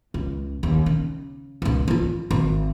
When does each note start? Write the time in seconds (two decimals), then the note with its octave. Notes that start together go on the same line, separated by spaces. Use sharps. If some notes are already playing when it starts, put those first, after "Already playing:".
0.14 C#2
0.63 D#2
0.86 C#3
1.62 C#2 G#2
1.88 D#4 F4
2.31 G#1